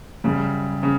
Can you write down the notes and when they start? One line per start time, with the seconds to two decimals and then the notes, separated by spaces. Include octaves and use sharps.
0.24 F#2 C#3 G3
0.83 C#3